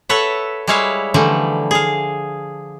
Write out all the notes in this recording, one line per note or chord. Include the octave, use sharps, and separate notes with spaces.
A4 B4 C#5 E5 F#5
G3 G#3 E4 C#5 E5 F5
D3 E3 F3 G3 A3
G#4 F5